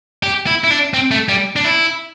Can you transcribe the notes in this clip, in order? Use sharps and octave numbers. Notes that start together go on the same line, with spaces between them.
G4
E4
E4
D4
C4
A3
G3
D4
E4